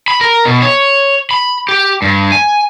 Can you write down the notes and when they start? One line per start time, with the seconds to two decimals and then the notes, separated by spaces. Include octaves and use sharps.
0.08 B5
0.21 A#4
0.45 B2
0.62 C#5
1.31 B5
1.69 G4
2.02 G2
2.32 G#5